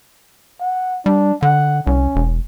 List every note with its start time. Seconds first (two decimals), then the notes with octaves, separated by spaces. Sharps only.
0.60 F#5
1.06 G3 D4
1.42 D3 F#5
1.87 C2 C#4
2.16 E1